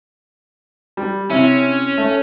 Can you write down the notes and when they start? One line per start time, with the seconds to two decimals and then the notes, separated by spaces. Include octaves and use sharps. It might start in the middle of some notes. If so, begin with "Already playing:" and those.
0.97 G3
1.30 C3 C#4 E4
1.97 A3